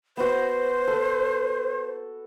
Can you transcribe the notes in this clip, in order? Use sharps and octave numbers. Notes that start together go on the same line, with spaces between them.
B3 F#4 C5
A4